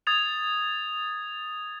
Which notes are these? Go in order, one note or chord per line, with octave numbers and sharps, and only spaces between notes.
D#6 G#6 A6 F7